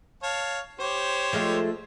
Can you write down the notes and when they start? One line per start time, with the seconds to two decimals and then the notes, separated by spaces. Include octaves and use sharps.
0.23 C#5 F5 A5
0.80 G4 C5 C#5
1.33 F3 G#3 A3